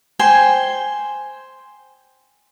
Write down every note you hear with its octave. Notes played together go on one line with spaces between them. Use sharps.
C5 G5 G#5